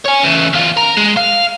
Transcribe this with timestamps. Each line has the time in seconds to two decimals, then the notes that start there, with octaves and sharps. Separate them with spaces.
0.06 C#5 G#5
0.24 C#3 E3
0.53 E2 F4
0.77 A#4
0.97 G#3
1.17 F5